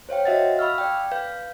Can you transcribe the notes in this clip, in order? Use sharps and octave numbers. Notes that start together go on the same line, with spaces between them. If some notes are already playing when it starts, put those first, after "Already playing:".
C5 C#5 F5 G5
F#4 D#5 E5 F#5 A6
F5 B5 C#6 E6 F6
D5 G5
B4 F5 G6